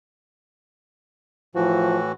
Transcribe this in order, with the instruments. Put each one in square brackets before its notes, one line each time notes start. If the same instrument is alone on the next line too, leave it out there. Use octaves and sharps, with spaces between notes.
[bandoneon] A2 E3 F#4 [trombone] F3